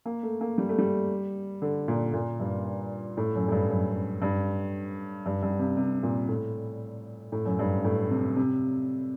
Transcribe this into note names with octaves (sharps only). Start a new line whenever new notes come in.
A#3
A3
A#3
G3
A3
G3
D3
A#2
A#2
G2
A2
F#2
A2
G2
F#2
G2
G2
G2
C3
C3
A#2
A2
A2
F#2
G2
A2
C3
C3